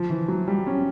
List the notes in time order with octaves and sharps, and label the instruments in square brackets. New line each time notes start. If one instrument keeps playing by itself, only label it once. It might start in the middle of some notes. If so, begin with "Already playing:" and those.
Already playing: [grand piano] F3
E3
F#3
G3
C#4